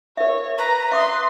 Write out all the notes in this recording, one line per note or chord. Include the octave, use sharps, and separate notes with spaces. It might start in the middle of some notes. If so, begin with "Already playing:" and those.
A#4 C#5 E5
B4 A#5
E5 C6 D6 D#6